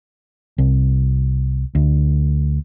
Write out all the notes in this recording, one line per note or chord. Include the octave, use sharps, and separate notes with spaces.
C2
D2